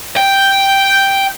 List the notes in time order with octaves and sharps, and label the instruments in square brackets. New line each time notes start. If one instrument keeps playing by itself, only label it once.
[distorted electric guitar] G5